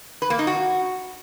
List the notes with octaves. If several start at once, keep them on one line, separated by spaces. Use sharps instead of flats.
B4
A#3
D#4
F#4